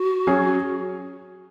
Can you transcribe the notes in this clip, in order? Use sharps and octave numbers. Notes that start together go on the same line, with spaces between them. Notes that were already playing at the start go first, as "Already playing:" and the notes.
Already playing: F#4
F#3 C#4 G#4 C#5